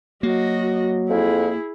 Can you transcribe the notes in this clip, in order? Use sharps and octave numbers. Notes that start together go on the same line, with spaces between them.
F#3 A#3 F#4 D#5
F2 E4 G#4